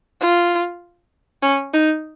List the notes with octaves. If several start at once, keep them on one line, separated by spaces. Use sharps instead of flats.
F4
C#4
D#4